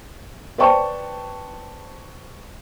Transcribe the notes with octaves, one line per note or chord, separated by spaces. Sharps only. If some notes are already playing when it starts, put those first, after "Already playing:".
B4 C5 D5 G5 A5 C#6